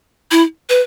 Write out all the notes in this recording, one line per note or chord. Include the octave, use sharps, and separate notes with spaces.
E4
B4